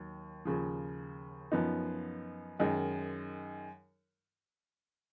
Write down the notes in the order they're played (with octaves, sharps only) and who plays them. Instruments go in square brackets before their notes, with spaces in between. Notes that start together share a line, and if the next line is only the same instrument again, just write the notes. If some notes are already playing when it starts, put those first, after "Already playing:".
Already playing: [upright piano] D#2 D#3 F#3
D#2 C#3 F3
F#2 F3 B3 D#4
F#2 D#3 G#3 D#4